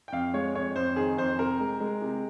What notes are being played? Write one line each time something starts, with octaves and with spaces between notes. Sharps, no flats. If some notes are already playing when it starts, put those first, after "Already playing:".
G5
F2 F5
G#3 C#5
F2 C#5
F2 C5
D#3 G#4
F2 C5
C3 A#4
G#3
G#3
C3